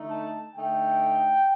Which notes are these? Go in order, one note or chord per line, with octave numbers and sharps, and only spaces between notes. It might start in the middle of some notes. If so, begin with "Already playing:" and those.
Already playing: D3 A3 D#4
A5
D3 A3 D#4 G5